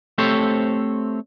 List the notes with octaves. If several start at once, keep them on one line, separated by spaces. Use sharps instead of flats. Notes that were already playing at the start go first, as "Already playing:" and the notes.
A3 C4 G4 A4 C5 C#5